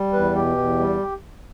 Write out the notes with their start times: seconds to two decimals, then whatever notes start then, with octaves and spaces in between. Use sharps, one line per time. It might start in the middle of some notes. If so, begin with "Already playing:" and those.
Already playing: G3
0.13 E2 B4
0.35 B2 G4
0.57 E2
0.79 G3